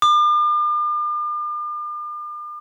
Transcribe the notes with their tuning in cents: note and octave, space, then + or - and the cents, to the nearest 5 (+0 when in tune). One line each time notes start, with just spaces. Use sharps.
D6 +45